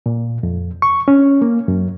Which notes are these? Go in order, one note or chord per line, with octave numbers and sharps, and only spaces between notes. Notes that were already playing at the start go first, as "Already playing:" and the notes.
A#2
F2
C#6
C#4
A#3
F#2